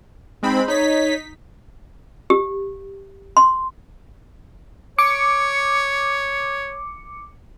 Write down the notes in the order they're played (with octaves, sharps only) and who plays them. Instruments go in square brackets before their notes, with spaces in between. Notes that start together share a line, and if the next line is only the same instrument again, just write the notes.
[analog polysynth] G#3 C4 B5 [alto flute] D#4
[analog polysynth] D#4 B6 [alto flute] C#5
[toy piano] G4
C6
[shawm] C#5 [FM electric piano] D6 C#7